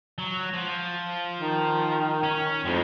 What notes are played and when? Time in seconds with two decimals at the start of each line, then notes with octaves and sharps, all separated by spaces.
0.18 F#3
0.54 F3
1.39 D#3
2.23 C#4
2.65 F2 A2 G#3